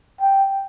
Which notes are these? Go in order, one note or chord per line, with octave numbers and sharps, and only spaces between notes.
G5